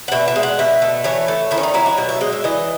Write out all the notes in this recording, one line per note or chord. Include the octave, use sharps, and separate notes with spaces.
F#5
B2 E5
E5
G#3
F#5
B2 E5
A3
E3 C#5
A3
D#3 E4
C#4
D#4
F#3 E4
F#4
B2 E5
E5
G#3 D#5
E5
E3 D#5